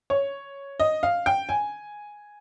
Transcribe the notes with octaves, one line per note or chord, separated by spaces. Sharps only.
C#5
D#5
F5
G5
G#5